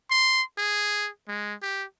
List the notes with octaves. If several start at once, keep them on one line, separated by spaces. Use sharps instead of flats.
C6
G#4
G#3
G4